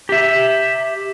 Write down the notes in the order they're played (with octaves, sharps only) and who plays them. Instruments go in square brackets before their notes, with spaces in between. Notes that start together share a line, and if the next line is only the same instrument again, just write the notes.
[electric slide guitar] G4 E5